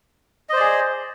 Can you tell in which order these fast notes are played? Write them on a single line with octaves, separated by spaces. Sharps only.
D#5 C5 D5 G#4